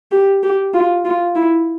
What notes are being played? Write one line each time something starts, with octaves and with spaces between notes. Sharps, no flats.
G4
G4
F4
F4
E4